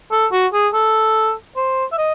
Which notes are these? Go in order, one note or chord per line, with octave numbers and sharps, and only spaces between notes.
A4
F#4
G#4
A4
C5
E5
D#5